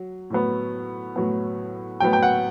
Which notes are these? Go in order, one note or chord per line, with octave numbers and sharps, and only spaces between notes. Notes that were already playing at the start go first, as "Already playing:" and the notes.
Already playing: F#3
A2 F#3 B3
A2 F#3 B3
A2 F#3 B3 G5
G5
F#5